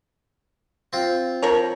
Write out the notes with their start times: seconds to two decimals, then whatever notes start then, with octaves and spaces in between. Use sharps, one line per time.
0.93 C4 F4
1.42 F3 A#4 C#5